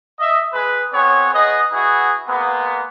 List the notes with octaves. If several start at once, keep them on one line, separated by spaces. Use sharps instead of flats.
D#5 E5
G#3 G#4 B4
B3 C4 G#4 C#5
B3 G#4 D#5
B3 E4 F#4 G#4
G#3 A#3 B3